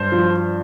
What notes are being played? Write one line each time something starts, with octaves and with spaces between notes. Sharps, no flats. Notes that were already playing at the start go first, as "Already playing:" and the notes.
Already playing: G2 C5
F3